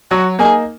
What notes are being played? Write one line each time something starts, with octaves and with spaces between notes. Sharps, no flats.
F#3 F#4
A#3 D#4 G#4